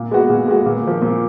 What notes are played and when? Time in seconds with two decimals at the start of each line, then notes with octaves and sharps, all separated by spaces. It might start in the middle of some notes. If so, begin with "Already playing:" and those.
Already playing: A#2
0.11 G#3 B3 F#4
0.29 A#2
0.48 G#3 B3 F#4
0.66 A#2
0.83 F3 A#3
1.02 A#2